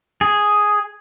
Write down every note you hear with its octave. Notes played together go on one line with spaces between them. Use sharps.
G#4